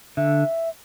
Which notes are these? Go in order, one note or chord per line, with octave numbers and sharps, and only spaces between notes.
D3 E5